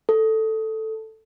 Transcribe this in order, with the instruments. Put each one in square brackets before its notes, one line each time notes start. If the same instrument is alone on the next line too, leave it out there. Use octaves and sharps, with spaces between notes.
[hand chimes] A4